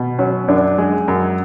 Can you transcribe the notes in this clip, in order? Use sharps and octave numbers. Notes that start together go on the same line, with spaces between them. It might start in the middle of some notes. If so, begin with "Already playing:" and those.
Already playing: B2
F#3 C#4
F#2 D4
G#3
F#2